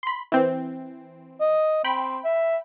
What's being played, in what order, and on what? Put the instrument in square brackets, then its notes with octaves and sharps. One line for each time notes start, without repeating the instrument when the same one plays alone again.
[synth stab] B5 C6
E3 C4
[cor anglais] D#5
[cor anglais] C4 [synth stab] G5 B5
[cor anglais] E5